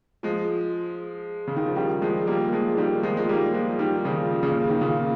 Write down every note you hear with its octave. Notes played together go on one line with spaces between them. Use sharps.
F3 G#3
C#3
D#3
F3
D#3 G3
F3 G#3
G3 A#3
F3 G#3
D#3 G3
F3 G#3
G#3
G3 A#3
F3 G#3
D#3 G3
C#3 F3
A#2 C#3
D#3
A#2 C#3